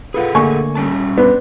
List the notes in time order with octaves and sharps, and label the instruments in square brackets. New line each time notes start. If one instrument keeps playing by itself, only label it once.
[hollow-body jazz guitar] F4 B4 [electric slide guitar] G#4 A4 F#5
[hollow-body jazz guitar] D3 A3 A#3 [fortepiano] G#5 C#6
[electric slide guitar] G3 C#4 A5
[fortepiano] B3 [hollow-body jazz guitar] D4 C5